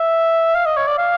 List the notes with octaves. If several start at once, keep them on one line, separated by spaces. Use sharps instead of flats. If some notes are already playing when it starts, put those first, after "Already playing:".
Already playing: E5
F5
D#5
C#5
D5
F5